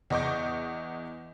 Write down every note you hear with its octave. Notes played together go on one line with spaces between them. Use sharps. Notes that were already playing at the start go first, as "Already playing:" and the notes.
E2 D#5 C#6 D6 G6